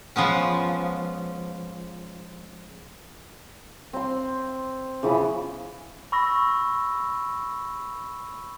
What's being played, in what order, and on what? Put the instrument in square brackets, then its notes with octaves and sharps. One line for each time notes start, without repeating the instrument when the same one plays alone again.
[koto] F3 G#3 B3 C#4
[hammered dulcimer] C4 C6
C#3 E3 F3 B3
[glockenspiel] B5 C#6 E6 A#6